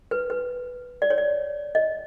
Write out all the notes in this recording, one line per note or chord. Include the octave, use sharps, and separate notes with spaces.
B4
B4
D5
C#5
D5
D#5